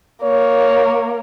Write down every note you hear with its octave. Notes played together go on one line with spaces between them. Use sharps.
A#3 C#5